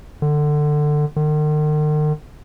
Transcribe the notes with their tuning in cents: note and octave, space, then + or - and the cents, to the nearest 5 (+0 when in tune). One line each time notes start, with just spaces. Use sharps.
D3 +20
D#3 -45